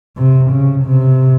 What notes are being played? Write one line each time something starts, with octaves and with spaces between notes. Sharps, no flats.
C3
C#3
C3